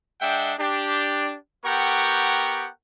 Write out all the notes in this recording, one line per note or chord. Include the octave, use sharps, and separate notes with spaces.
G#3 D4 E5 F#5 G5
D4 G4
B3 G4 A#4 F#5 G5 C#6